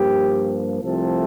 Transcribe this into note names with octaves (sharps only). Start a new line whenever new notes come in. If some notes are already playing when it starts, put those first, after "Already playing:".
Already playing: G2 F3 A#3 G4
C2 C3 F3 A3 C4 A4